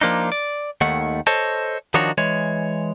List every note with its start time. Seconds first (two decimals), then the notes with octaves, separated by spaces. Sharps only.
0.01 F3 A#3 D4 D#4
0.32 D5
0.81 D#2 D#3 A3 F#5
1.27 A4 C5 C#5 D#5 A5
1.94 D#3 F3 D4 D#4 F#4 C#5
2.18 E3 G#3 C#5